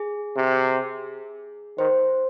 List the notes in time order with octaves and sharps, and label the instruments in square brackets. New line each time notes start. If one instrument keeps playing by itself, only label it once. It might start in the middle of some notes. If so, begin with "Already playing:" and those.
Already playing: [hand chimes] G#4
[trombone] C3
[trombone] D#3 [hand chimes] C5